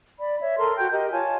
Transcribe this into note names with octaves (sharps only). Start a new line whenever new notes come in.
D5 B5
C#5 E5
A4 A#4 C6
F#4 G5 G6
G4 A#4 D#5
F4 C#5 G#5 A5